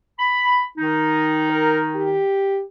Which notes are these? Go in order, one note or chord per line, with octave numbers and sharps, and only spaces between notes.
B5
D#3 D#4
A#4
G4